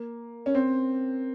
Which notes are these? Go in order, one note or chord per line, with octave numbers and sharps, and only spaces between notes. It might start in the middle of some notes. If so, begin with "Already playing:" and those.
Already playing: A#3
C#4
C4